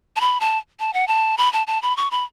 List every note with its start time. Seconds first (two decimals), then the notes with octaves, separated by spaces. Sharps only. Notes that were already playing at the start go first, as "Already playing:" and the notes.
0.16 A5
0.21 B5
0.40 A5
0.80 A5
0.93 F#5
1.08 A5
1.38 B5
1.53 A5
1.67 A5
1.82 B5
1.97 C#6
2.11 B5